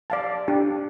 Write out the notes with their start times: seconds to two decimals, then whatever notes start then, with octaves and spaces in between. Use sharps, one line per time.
0.10 D5 F5 A5
0.48 D4 G4